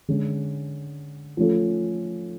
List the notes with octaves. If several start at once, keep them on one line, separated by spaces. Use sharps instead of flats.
D3 G#3 C#4
F3 A3 C#4 F4 A4